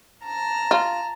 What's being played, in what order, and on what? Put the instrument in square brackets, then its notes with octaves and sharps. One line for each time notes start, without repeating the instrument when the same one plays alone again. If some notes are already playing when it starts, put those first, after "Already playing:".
[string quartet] A5 A#5 F6
[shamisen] F4